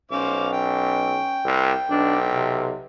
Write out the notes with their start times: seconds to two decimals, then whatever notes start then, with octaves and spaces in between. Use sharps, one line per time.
0.11 B1 C#4 C5 F5 D6
0.53 G5
1.45 C2
1.90 B1 D4
2.31 C3